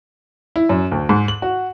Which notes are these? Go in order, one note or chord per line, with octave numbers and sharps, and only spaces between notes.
E4
F#2
D2
G#2
F#7
F#4